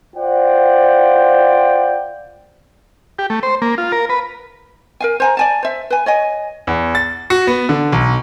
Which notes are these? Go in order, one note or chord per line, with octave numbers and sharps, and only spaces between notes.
F4 C5 D5 F#5 G5
G4
A3
C5
A#3
F4
A#4
B4
A#4 F5 G#5
C5 G#5 A#5
D5 G#5 A5
C5 E5
B4 G#5
C#5 D#5 G#5
E2
A6
F#4
B3
D3
B1